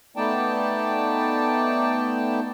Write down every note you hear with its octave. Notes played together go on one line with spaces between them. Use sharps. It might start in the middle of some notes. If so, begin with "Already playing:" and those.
A3 B3 D#4 D5 G5 A5